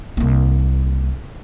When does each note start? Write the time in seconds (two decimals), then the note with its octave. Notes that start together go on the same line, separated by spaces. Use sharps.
0.17 C2 A#3